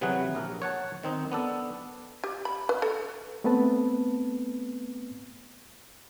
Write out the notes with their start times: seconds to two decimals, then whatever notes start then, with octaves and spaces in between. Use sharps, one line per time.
0.01 C3 E3 F#3 F#4 G#4 B4
0.35 A#1 A#4
0.62 C#5 F#5 A5
1.03 D#3 C4 D#4
1.32 B3 D4 A4
2.24 G4
2.45 B5
2.69 B4
2.82 A4
3.44 A3 B3 C4 B4 A5